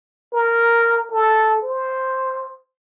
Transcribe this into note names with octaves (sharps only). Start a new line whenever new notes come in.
A#4
A4
C5